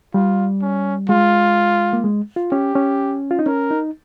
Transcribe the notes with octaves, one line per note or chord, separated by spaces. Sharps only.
G3 F4
C#4
G#3 F4
A#3
G#3
F4
C#4 G4
C#4
F4
D#4
C#4 A#4
D#4